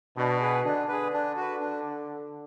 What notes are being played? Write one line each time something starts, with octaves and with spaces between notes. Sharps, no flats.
B2 D4
G#4 B4
D3 D4
G#4 B4
D4
F#4 B4
D4